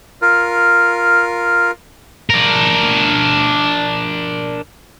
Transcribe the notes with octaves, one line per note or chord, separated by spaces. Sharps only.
F4 A#4
D4 A#4